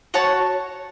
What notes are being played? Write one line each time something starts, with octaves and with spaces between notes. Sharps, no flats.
F#4 C#5 A5